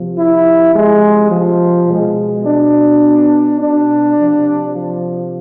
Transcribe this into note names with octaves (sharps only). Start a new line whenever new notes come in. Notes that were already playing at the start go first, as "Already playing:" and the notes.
Already playing: C3 F3
E4
G#3
F3
B2 G#3
D4
D4
C3 F3
F3